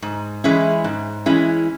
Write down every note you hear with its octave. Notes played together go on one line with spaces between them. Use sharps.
G#2
E3 G#3 C#4 E4
G#2
E3 G#3 C#4 E4